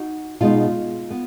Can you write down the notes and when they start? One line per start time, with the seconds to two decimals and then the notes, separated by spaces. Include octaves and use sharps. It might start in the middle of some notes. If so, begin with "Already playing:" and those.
Already playing: D#4 F#4
0.40 B2 G#3 D#4 F4
1.11 B3